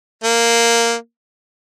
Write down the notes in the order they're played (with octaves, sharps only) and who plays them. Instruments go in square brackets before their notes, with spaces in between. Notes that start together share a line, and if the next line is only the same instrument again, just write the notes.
[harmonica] A#3